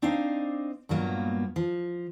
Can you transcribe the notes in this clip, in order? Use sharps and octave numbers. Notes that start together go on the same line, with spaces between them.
C4 D4 D#4 C5 D#5 F5
G2 A#2 F#3 A#3 B3
F3